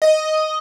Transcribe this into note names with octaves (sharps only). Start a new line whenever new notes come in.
D#5